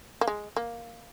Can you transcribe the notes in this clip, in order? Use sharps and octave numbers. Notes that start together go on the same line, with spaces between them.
A#3
G#3
A#3